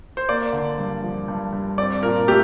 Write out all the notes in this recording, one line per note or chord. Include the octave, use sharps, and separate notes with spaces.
C5
A#3 D5
D3
G2
F3
G2
G2
C4 D5
A#2 A#4
A3 G4